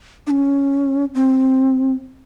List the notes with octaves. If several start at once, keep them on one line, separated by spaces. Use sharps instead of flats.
D4
C#4
C4